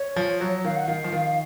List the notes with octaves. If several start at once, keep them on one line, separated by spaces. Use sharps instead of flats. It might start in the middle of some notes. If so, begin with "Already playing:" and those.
Already playing: C#5
F3
F#3
D#3 F5
F#5
D#3 F5
F3
D#3